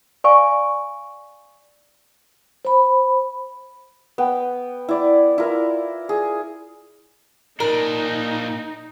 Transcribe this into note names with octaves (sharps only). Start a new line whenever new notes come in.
D5 F5 G#5 C#6
C5 B5
B3 G5
E4 D5
E4 F4 A#4
G#4
A#2 D4 D#4 A#4